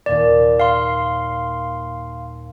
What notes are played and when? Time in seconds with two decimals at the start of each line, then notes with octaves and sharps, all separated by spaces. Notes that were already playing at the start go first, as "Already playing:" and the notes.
0.06 D#2 A#2 A#3 D5
0.60 F5 C6